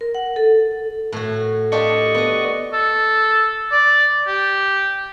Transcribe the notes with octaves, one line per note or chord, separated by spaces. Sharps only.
A#4
F#5
A4
A2 F#4
D4 F4 G4 D5 D#5 C#6
B3 F#4
A4
D5
G4